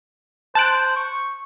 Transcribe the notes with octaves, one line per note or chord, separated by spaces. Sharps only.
C5 A5 F#6 D7
C#6